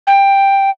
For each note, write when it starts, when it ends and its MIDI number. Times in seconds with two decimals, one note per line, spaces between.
0.07 0.70 79